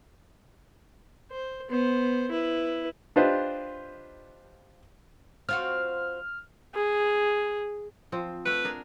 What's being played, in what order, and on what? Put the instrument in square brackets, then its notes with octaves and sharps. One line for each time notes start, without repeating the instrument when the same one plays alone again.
[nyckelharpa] C5
B3 C5
E4 B4
[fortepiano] D4 F4 G4 B4 C5 D#5
[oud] C4 F4 F#4 [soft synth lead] F6
[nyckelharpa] G#4
[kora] F3 C4
[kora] A3 F#5 [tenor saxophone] B4
[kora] D4 G#4 A#4